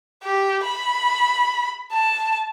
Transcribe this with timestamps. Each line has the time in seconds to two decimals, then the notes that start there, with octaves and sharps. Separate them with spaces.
0.24 G4
0.64 B5
1.92 A5